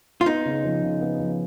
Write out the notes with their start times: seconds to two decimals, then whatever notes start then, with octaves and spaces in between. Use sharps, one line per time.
0.21 F4
0.26 B3 D#4
0.45 C#3
0.64 F3
0.83 C#3
1.01 B3
1.19 F3